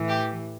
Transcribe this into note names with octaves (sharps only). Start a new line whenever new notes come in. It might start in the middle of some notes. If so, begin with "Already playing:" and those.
Already playing: A2 E3
G4